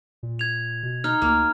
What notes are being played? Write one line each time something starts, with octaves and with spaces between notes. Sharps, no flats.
A#2
G#6 F7
B2
D#4 F6
D2 A#3 F6